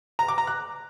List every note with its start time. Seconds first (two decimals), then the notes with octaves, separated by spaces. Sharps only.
0.19 A#5
0.28 D6
0.38 A#5
0.47 F#6